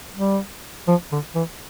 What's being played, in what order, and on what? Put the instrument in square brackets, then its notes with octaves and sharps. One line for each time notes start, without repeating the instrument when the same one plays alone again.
[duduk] G3
F3
D3
E3